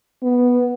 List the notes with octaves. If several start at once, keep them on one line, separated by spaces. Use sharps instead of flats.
B3